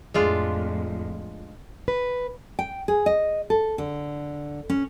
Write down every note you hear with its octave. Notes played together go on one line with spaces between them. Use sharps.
F2 A2 G#3 D4 F4
B4
G5
G#4
D#5
A4
D3
C#4